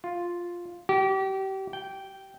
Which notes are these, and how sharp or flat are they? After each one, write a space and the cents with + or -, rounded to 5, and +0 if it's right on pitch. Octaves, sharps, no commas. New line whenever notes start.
F4 +5
G4 -30
G5 -10